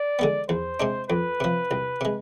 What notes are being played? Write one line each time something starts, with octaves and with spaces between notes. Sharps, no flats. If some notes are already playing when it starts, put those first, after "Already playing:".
Already playing: D5
D3 G#3 B3
E2 C5
C3 G#3 D4
F2 B4
C3 F3
C2
C3 G#3